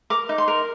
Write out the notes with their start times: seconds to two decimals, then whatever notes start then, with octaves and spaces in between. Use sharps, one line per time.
0.10 A#4 D6
0.29 D#4
0.38 C6
0.48 A#4